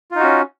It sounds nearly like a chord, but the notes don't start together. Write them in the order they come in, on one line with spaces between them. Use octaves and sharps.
F4 D#4 F#4 C#4